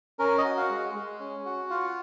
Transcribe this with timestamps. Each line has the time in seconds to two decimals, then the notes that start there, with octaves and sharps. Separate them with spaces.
0.19 C#4 A#4
0.38 D#5
0.44 F#4
0.57 F5
0.70 G#3
0.95 G#3
1.20 C#4
1.45 F#4
1.70 F4 F5